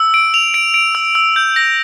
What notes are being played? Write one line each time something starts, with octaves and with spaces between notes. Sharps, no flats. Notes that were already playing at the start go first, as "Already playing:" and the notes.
Already playing: E6
D7
F7
D7
D7
E6
E6
G6
A#6